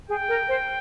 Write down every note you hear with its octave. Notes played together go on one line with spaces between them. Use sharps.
G#4 G5
A#4
C5